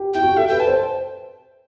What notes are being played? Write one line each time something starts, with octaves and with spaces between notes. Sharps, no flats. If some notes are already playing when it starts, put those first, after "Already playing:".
Already playing: G4
E4 G5
F#4
G4
A4 E5
B4 G5
A5
C5